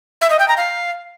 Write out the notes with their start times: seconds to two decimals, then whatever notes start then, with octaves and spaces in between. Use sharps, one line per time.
0.21 E5
0.30 D#5
0.39 G5
0.48 A#5
0.57 F5